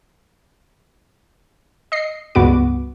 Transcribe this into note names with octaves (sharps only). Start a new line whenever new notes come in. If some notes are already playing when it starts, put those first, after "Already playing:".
D#5 C7
C#2 G2 B3 F#4 D6